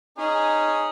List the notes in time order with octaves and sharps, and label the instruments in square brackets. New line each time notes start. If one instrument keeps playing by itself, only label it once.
[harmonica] C#4 G#4 D#6 [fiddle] D#4